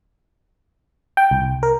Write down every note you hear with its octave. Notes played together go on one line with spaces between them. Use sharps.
G5
C2
A#4